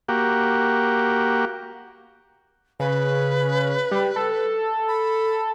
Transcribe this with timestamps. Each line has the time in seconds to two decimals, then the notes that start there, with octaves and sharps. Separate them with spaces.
0.08 A#3 F#4 G4
2.80 C#3 B4
3.91 G3
4.16 A4
4.88 B5